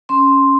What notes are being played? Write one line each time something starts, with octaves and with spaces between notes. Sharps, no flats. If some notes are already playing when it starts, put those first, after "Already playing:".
C#4 C6